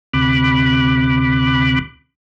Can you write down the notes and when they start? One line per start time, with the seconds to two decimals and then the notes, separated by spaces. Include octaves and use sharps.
0.13 D2 C3 B5 D6 F#6